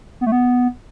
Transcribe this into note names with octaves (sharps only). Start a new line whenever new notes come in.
B3
A3
B3